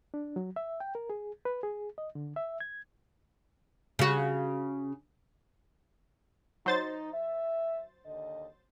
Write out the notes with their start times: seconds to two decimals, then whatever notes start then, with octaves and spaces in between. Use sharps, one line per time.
0.14 D4
0.36 F#3
0.56 E5
0.80 G5
0.95 A#4
1.10 G#4
1.45 B4
1.63 G#4
1.98 D#5
2.15 D3
2.36 E5
2.60 G#6
3.99 C#3 F#4
6.66 F#3 D#4 C5 A6
7.13 E5
8.06 D#2 D3 D#5